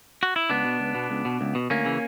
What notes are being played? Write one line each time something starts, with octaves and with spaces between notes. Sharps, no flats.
F#4
E4
C#2 B3 D4
B2
C#2
B2
C#2
B2
C#2
B2
D2 A#3 C#4
C#3 E3